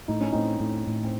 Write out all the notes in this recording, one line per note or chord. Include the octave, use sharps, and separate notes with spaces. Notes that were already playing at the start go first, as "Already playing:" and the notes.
A2 D#4
C#4
A2 C4 D#4
A2
A2
C4